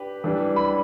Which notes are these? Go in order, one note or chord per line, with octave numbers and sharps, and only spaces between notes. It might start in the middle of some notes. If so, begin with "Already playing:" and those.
Already playing: D4 G4 B4
E3 G3 D4
B5